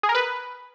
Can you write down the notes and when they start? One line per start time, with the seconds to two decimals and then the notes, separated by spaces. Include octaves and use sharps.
0.03 G#4
0.09 A#4
0.15 B4